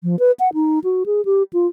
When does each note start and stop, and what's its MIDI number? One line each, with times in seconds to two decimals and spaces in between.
0.03 0.19 53
0.19 0.32 71
0.40 0.53 78
0.54 0.79 63
0.84 1.04 66
1.06 1.24 68
1.25 1.43 67
1.53 1.67 65